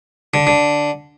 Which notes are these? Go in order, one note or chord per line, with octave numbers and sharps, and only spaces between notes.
D3
D3